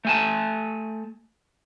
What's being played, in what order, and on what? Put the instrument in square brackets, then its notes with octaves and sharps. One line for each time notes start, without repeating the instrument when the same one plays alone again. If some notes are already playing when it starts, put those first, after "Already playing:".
[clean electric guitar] A3 G#5 A5